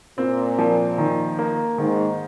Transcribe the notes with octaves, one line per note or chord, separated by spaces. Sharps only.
A#2 C4
F3
D#3
A#3
G#2 D#3